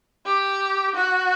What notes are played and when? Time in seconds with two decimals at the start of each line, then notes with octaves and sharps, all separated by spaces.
0.26 G4
0.95 F#4